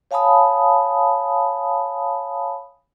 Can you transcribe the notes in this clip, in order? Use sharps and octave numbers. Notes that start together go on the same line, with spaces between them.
C#5 F5 G#5 A5 B5 D#6